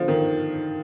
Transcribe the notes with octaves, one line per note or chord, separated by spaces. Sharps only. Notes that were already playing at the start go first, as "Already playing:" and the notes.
Already playing: D3 F3
D#3